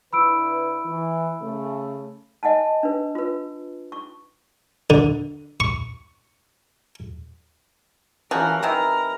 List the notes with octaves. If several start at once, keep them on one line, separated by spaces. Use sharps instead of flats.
D3 E4 B4 B5 E6 D7
E3
C#3 A3
D#5 F#5 G#5 A5
D4 B4
F4 B4
C#6
D3
C#6
E3 F3 C#4 F#4 A#4
C3 D#3 E3 A#4 A#5